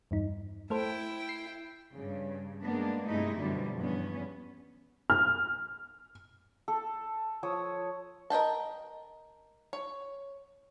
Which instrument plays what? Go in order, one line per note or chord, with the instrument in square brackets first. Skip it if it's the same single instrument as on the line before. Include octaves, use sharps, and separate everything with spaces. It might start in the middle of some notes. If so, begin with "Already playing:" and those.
[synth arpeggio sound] E2 G2 D#4
[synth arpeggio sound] A3 A4 C5 [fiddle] E4 G5
[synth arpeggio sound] C7
[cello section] G2 C#3
G#3 A#3 B3 D4
G2 C3 G#3 A3 D#4 E4
F#2 B2 D3 F3 G3
E2 G2 B3 C#4
[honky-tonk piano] F6
[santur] A4
F3 C#5 D#6 E6
[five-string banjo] A#4 D#5 G5 A5
C#5